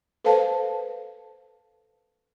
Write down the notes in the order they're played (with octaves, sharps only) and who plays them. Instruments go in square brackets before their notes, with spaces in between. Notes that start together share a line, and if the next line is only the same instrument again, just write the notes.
[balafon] A4 B4 C5 F5 A5